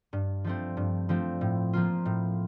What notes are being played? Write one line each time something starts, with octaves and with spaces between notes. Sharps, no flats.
G2
F3 A3 C4
G2
F3 A3 C4
A2
F3 A#3 F4
A2